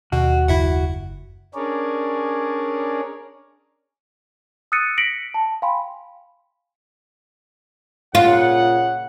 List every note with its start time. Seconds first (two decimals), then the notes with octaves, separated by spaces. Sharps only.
0.12 D#2 B2 F#4
0.48 F#1 E4 E5 F#5
1.55 C#4 D4 G#4 A#4 C#5 D5
4.72 D#6 E6 F#6 A6 C#7 D#7
4.97 A#6 B6 C#7 D7 F#7
5.34 A5
5.62 F5 G5 G#5 B5 C6
8.15 A#2 C#3 F4 F#5